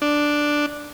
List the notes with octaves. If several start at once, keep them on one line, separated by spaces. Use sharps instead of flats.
D4